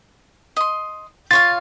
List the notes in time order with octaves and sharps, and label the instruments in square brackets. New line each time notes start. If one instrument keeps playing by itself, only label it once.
[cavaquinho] D#5 C6
[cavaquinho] F4 C#5 F5 [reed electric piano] A6